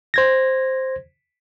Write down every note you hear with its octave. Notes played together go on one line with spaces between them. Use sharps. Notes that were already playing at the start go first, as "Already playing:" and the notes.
C5 G#6 A#6